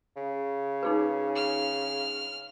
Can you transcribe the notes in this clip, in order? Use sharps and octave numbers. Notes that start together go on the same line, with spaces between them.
C#3
D#4 G#4 B4
F6